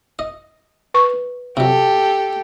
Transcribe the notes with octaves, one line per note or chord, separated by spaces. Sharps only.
D#5
B4 C#6
C3 F#3 G4 A4